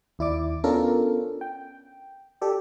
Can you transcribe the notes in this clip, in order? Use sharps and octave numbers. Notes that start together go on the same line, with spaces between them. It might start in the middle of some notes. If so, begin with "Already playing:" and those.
D#2 E4 D5 D6
B3 C#4 D4 F4 A4 A#4
G5
G4 A4 D5